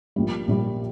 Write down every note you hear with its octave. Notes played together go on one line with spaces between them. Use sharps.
A#1 A#2 G3
A#1 A#2 G3